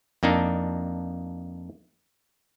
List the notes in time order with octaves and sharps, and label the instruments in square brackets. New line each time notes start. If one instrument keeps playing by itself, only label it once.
[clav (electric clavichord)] F2 A#3 D4 D#4